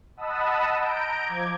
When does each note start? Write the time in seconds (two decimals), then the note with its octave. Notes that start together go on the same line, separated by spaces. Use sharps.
0.17 D#5 F#5 A5 B5 D#6 E6
0.80 A#5 G6 D7
1.25 F3 D6 G#6